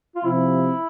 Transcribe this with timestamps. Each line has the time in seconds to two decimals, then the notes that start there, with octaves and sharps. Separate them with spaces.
0.16 F4
0.24 C3 F3 C4 E4